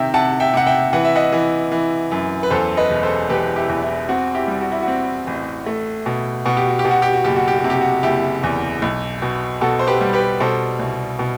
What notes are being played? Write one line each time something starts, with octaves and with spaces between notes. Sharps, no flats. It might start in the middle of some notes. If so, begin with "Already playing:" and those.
Already playing: C3 D#3 E5 G5
C3 F#5 A5
E5 G5
C3 F#5
E5 G5
E3 F#5
E5
D#5 F#5
E3
E3
F#2
B4
E2 A4 C5
B4 D#5
E1
A4 C5
E1 G4 B4
E4 G4
E2
E4
C4 F#4
E4 G4
G3
F#4
E4
F#4
C4
A1
A3
B2
B2 F#4
G4
F#4
G4
B2
F#4
G4
F#4
F#1 G4
F#4
G4
F#4
C3
G4
F#4
F#1 E4 G4
E2
B1
B2
B2 F#4 A4
C5
G4 B4
G3
G4 B4
B2 A4 C5
C2
B2